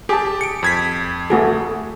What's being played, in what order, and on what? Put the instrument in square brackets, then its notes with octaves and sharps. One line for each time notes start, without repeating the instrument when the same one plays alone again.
[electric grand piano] G4 A5 [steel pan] G#4
[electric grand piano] C#7 D7
F2 G#6 B6
[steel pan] A3 F#4 G#4